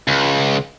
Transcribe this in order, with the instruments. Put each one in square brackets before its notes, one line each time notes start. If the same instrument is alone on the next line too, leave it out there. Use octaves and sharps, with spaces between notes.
[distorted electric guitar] C#2